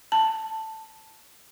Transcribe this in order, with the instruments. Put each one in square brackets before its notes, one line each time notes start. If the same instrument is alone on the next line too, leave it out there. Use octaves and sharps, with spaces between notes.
[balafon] A5